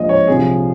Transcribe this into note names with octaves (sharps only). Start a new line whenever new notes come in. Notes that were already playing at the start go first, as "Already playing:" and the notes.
Already playing: A#1 A#2 F3 G#3 D#5
C#5
C2 C3 F3 G#4